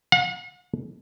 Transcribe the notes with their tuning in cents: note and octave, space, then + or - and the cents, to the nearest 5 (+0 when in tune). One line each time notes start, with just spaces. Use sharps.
F#5 -45